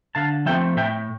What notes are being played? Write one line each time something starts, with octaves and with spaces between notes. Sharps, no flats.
D3 F5 A5
F3 A3 C4 E5 G5
A2 E5 G5